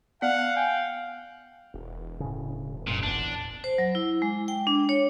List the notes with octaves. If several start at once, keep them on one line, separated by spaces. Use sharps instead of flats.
B3 D5 F5 F#5
G5 G#5
E1
A2 C#3
F#2 A#2
A1 E2 D4
C5
F#3
E4
G#3
G5
D4
C#5